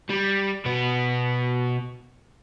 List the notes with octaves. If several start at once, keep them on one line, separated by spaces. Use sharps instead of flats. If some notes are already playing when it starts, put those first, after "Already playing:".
G3
B2 B3